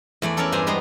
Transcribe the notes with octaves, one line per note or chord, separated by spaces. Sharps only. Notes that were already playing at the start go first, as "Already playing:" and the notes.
E2 A3 D5
C#4 A4 A#4 C#5 D5
G2 D4 C5 G#5 A#5
G3 G#3 B3 A#5 C6